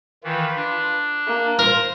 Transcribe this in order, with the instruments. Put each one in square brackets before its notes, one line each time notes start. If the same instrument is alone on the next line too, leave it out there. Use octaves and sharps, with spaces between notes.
[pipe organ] D#3 E3 [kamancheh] F4 B4
[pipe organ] D4
[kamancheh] A#3
[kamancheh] F4 C5 [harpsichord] A#4